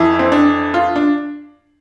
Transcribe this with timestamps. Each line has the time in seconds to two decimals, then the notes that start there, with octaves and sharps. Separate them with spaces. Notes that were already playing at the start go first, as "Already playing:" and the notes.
Already playing: F2 E3 E4
0.19 C4
0.32 D4
0.74 F4
0.96 D4